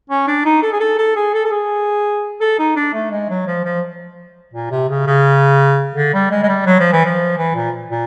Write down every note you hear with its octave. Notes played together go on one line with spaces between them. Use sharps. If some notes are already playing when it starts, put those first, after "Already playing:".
C#4
D4
D#4
A4
G#4
A4
A4
G#4
A4
A4
G#4
A4
D#4
D4
A3
G#3
F#3
F3
F3
A#2
C3
C#3
C#3
D3
G3
G#3
G#3
G3
F#3
F3
E3
F3
E3
A#2
A#2